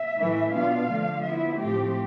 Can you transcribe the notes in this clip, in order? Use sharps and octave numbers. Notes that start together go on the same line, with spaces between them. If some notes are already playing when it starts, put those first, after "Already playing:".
Already playing: E5
A2 E3 A3 E4
B2 B3 D4 F4 F5
D3 F3 A3
F3 B3 E4 E5
A2 F3 A3 C4 G4